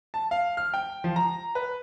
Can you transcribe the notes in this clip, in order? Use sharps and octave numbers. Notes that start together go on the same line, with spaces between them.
A5
F5
F6
G5
F3
A#5
B4